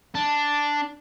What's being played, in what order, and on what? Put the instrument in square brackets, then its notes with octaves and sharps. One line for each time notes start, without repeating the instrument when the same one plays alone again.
[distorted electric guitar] D4